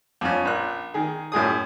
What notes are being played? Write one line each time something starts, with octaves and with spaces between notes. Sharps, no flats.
F2 C#4
A#1 F#6
D#3 G#4
F#2 A2 G#4 D#6